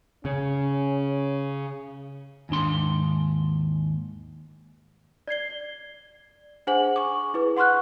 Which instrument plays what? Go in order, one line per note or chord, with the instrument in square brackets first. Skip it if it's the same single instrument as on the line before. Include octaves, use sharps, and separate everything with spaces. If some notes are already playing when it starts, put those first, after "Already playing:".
[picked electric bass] C#3 [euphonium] C#4
[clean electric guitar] D#2 G#2 D4 C6
[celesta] D5 G#6 C7 G7
D4 G#4 C5 F#5 G#5 F#7
C#6 D6
E4 G#4 B4
F#5 C6 C#6 F6 F#6